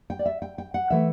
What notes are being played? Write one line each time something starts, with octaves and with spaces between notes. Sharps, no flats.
G5
D5
E5
G5
G5
F#5
E3 A3 E5